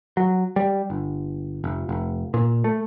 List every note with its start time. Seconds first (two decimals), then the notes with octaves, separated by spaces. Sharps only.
0.17 F#3
0.56 G3
0.90 G1
1.64 F1
1.89 F1
2.34 A#2
2.64 A3